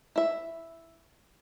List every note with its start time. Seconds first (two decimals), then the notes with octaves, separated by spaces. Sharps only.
0.16 E4 E5